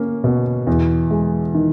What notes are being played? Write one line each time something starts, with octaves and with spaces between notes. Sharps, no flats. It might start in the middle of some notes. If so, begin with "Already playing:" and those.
Already playing: A#3 C#4
B2
E2
G#3
D#3